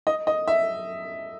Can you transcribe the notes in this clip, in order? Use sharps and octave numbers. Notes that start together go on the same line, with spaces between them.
D#5
D#5
E5